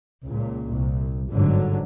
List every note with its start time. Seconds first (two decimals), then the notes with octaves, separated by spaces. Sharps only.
0.25 C#2 A#2
0.72 C2
1.31 G1 G#2 D3 F#3